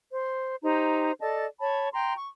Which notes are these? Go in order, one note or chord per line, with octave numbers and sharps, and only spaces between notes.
C5
D#4 G4 C5 A#5
A4 D5 D#5 A5
C#5 A5 B5
G5 A#5 C6
C#6